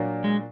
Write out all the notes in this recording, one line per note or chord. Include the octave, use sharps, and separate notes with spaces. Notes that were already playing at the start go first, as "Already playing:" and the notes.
Already playing: A#2 F#3 A#3 D4
G#3